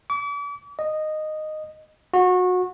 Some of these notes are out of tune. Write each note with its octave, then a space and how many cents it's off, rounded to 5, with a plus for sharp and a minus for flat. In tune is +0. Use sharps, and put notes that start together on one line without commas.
D6 -40
D#5 -10
F#4 -25